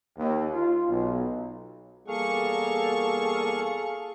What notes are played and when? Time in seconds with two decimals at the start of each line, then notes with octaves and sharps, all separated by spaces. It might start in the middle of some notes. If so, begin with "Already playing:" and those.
0.18 D#2
0.54 F4
0.89 B1
2.08 E2 G3 A#3 G#4 A4 F5 C#6